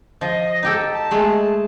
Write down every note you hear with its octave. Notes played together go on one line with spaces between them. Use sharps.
F3 D#5
D#4 G4 A4
A5
G#3 A3 G#4